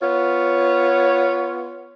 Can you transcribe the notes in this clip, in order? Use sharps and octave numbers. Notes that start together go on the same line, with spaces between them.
B3 F4 C#5